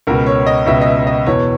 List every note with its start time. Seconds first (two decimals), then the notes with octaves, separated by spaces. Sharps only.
0.07 C#2 B2 A#4
0.26 C#5
0.47 D#5
0.66 C#2 B2 E5
0.81 D#5
0.86 E5
1.07 D#5
1.26 E2 B2 C#5